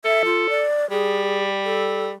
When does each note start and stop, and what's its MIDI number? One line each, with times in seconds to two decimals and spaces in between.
0.05 0.63 69
0.05 0.23 76
0.25 0.48 65
0.50 0.89 74
0.91 2.13 55
0.91 1.43 68
1.65 2.06 69